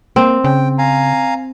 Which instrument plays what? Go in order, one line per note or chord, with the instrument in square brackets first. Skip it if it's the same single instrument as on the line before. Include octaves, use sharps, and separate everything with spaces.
[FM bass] A#3 [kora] C4
[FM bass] C#3 [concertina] G5
[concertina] F5 G#5 A#5